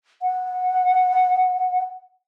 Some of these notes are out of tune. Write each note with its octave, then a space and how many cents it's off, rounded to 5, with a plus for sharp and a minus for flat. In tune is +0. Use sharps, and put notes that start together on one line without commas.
F#5 -10